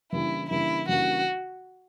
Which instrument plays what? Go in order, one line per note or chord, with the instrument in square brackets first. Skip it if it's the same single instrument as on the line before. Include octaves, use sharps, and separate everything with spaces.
[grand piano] C#3 E3 G3 A#3 D4 [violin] E4
[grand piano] C#3 E3 G3 A#3 D4 [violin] E4
[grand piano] C#3 E3 G3 A#3 D4 [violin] F#4